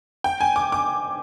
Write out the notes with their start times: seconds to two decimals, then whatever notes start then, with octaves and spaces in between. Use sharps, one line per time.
0.24 G5
0.41 G#5
0.56 D6
0.72 D6